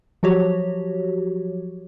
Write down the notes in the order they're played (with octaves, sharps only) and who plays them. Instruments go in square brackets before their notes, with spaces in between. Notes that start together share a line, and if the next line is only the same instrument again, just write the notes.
[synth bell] F3 F#3 F#4 G4 C#5